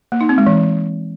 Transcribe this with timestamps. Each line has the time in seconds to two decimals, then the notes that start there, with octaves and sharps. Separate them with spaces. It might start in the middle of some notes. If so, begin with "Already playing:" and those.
0.12 A#3
0.21 D#4
0.29 C4
0.38 G#3
0.46 E3